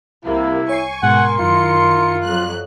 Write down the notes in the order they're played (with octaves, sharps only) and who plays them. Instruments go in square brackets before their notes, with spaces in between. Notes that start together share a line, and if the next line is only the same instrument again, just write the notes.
[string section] C2 C3 A#3 [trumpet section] E4
[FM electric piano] C#5 C7 [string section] G#5 C#6
[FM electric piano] G#2 B2 [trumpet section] A#4 C6 [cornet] F#5
[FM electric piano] F#2 [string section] D#3 E4 C#7 [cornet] F4
[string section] F2 F#3 F#6